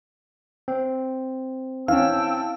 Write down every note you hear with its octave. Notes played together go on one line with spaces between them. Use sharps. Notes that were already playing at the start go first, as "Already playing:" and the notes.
C4
E3 C#4 F5 G5 A5 E6